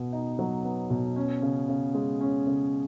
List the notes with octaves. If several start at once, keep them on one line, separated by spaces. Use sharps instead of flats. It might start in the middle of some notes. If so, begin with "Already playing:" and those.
Already playing: B2 B3
D#4
F#3
B3
B2
C#4
C#3
C#3
G#3
C#4
C#3